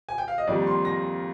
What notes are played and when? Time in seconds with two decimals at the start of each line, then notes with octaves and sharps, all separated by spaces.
0.09 G#5
0.18 G5
0.28 F5
0.38 D#5
0.47 F2 D#3 G3 A#3 D5
0.67 C6
0.85 A#6